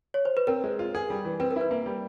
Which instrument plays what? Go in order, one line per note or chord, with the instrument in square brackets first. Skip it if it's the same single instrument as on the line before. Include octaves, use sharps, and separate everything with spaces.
[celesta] C#5
C5
B4
[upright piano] C4 [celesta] A#4
[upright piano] G#3
F4
G#4
G3
E3
[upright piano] C4 [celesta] B4
[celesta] A#4
[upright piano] E4 [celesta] B4
[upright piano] A#3
G3